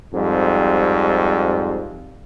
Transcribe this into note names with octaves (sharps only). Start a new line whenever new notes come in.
F2 G#2 G3